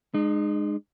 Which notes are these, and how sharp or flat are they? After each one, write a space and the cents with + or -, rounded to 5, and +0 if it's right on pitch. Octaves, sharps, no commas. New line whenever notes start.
G#3 +0 D#4 -45